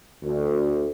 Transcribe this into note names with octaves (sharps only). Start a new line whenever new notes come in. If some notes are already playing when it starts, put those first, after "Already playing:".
D2